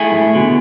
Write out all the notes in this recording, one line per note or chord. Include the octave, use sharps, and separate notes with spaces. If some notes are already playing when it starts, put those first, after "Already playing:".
Already playing: A3 E4 G#4
A2
B2 D3